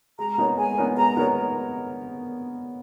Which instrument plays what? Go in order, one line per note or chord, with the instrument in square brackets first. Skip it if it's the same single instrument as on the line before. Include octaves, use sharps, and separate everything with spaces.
[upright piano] G#3 [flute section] A#5
[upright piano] B3 D#4 A#4 C#5
[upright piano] G#3 [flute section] G#5
[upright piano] B3 D#4 A#4 C#5
[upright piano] G#3 [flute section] A#5
[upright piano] B3 D#4 A#4 C#5